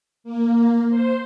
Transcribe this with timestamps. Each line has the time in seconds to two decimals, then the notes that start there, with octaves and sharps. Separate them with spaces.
0.24 A#3
0.90 C5